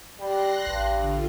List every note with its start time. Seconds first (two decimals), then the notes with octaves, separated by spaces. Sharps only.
0.20 G3 C6 F#6 A#6
0.67 A1 G2
0.97 D3 F4